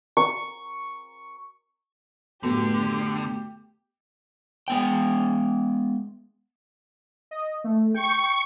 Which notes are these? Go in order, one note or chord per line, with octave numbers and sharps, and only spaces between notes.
C#6
F#2 A2 D3 A3 B3 F#4 G4
G#3 B3 G5
D#5
A3
G5 C#6